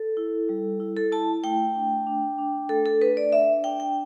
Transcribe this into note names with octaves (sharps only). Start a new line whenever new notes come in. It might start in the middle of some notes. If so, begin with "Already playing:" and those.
Already playing: A4
E4
G3
E4
A4
E4 A5
A3 G5
D4
D4
D4
A3 A4
A4
D4 B4
D5
D4 E5
D4 G5
G5